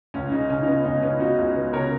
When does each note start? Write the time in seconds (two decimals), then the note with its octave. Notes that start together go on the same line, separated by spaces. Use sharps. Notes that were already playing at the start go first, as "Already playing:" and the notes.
0.14 C#2 C#4
0.32 C#3 D#4
0.50 C#3 C#4
0.62 D#4
0.67 B3 C#4
0.84 C#2 D#4
1.02 B3 C#4 F4
1.20 C#3 D#4 F#4
1.38 C#2
1.56 B3
1.73 C#3 A#4 C#5